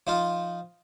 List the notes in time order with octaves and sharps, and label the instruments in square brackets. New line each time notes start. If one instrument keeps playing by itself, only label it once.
[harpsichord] F3 D#4 F4